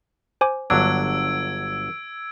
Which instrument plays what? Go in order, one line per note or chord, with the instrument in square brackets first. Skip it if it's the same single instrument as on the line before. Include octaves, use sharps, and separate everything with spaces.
[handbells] C5 G#5 D6
[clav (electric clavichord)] G1 F#3 D4 [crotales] E6 G#6 D7